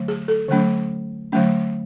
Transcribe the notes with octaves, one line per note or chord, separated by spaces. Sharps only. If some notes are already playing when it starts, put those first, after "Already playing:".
Already playing: D3 F#3 A3
G#4
A4
D3 F#3 A3 C#4
D3 F#3 A3 C#4